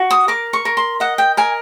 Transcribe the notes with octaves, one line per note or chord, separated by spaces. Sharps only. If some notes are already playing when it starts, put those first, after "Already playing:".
Already playing: F#4
D#6
A#4 D6
C#6
A#4
C6
D#5 F#5
G5
A#4 G#5